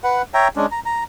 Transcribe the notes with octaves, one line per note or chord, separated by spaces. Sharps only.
B4 F#5
C#5 E5 G5 A#5
G#3 C#4 D4
A#5
A#5